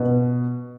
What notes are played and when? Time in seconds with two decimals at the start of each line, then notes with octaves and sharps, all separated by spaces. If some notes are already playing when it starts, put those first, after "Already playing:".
Already playing: B2